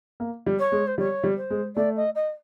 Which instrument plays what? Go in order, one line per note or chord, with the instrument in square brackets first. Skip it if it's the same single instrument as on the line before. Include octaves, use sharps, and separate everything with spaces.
[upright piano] A#3
G3
[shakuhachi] C#5
[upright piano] G#3
[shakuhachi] C5
[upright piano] G3 [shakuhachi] C#5
[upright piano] G3
[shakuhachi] C5
[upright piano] G#3
[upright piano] A3 [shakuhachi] D5
[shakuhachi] D#5
D#5